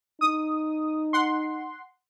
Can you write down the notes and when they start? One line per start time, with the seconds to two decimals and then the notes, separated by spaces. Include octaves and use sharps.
0.21 D#4 D#6
1.13 F#5 C6